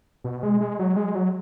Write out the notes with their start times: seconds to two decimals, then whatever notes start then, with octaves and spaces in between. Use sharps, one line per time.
0.24 B2
0.43 G#3
0.61 G#3
0.79 F#3
0.96 G#3
1.15 F#3